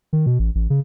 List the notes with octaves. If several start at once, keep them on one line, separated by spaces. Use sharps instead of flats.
D#3
B2
A1
A1
C#3